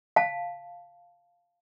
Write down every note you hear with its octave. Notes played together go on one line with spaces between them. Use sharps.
F5 A5